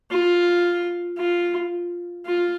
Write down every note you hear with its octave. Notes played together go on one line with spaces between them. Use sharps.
F4
F4
F4